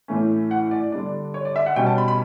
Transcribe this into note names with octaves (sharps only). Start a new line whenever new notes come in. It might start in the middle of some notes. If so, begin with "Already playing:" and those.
A2 E3 A3 C#4
F#5
D5
D3 G3 D4 D5
C#5
D5
E5
F#5
B2 G3 C#4 G5
A5
B5
B5